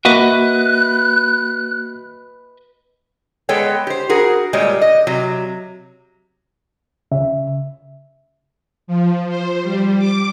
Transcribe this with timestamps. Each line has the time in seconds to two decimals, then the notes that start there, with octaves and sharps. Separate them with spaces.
0.05 A#3 F#4 B4 D#5 E5 F#6
3.49 G#3 B3 A4 C#5 G5
3.87 G4 C5
4.09 F#4 G#4 A#4
4.53 A#2 G3 G#3 C#5 D#5
4.81 D#5
5.07 C3 F#3
7.12 C#3 E5
8.87 F3
9.29 C5
9.62 G3
9.98 D6